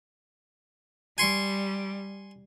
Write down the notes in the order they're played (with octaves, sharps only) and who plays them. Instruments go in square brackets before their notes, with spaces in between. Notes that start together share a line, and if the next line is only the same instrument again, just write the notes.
[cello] G3 [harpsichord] G#5 C6 C#6